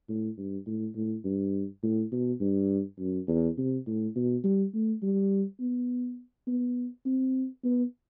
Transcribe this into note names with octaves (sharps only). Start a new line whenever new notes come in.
A2
G2
A2
A2
G2
A2
B2
G2
F#2
E2
C3
A2
B2
G3
A3
G3
B3
B3
C4
B3